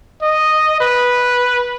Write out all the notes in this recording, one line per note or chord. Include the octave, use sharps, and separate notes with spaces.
D#5
B4